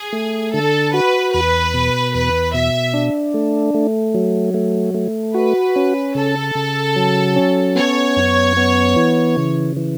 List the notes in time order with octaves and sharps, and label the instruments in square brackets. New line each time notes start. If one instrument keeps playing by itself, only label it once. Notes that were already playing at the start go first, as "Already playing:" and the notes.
Already playing: [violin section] G#4
[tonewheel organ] A3
[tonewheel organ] D3 [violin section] A4
[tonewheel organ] F#4 [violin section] B4
[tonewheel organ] E2 [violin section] B4
[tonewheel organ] B2
[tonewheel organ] E2 [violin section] B4
[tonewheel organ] B2 [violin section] E5
[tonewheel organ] D4
A3
A3
F#3
A3
A3
[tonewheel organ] F#4 [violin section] B4
[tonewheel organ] C#4
[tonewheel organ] C#3 [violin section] A4
[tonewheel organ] C#3
F#3
C#4
[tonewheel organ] B3 [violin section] C#5
[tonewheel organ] F#2
B3
E3
C#3
E3